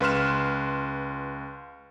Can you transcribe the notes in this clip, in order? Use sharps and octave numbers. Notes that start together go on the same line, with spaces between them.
C#2 B4 C6 F6 E7